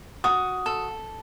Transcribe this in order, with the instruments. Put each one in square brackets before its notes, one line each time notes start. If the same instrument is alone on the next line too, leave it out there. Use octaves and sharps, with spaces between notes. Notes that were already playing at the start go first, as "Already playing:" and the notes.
[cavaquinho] F#4 [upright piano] D#6
[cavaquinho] A4